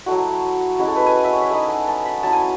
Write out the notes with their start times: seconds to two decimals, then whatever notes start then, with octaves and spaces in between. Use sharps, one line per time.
0.06 F#3 A3 E4 F#4
0.79 G#3 C#4 E4 F#4
0.87 A4
0.96 B4
1.06 G#5
1.15 F#5
1.24 E5
1.33 C#5
1.42 E5
1.51 A3 D#4 F#5
1.69 G#5
1.88 A5
2.05 B5
2.22 F#3 C#4 E4 A5
2.33 G#5